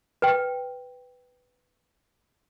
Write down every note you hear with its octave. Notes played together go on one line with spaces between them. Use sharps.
B4 G5